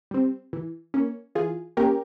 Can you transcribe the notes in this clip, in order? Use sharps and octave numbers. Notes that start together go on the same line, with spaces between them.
G3 C4
E3
A#3 C#4
E3 F4 G#4
A#3 C#4 G4 A#4